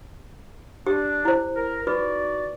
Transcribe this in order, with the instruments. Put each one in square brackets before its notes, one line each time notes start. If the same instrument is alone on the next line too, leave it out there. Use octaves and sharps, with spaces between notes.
[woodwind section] D4 [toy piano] G4
[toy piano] E4 C5
[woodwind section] A#4
[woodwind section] D#4 F#4 D5 [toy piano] F4 B4